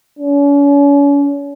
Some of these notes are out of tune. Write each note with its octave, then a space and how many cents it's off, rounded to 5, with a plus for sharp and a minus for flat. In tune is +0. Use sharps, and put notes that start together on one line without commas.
C#4 +40